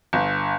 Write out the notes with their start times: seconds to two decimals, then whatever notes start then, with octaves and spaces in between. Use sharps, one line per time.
0.13 G1